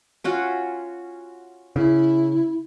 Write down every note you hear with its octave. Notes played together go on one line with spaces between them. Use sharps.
C#4 F4 F#4
C#3 E4